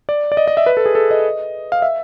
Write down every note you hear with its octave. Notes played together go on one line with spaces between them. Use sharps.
D5
D5
D#5
D#5
E5
B4
A4
G#4
A4
D#5
F5
E5